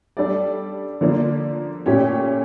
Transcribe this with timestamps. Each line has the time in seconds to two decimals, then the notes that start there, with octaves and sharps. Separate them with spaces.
0.17 G3 D4 A4 D5
1.01 D3 F3 A#3 D4
1.86 A#2 A3 C#4 G4 C#5